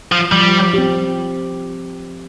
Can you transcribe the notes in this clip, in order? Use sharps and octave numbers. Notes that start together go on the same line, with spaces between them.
F3
F3 G3
C4 G4